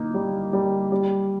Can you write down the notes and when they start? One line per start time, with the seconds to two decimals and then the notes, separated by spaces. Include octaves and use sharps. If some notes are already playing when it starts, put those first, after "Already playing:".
Already playing: A#3 D#4
0.14 G3
0.53 G3
0.92 G3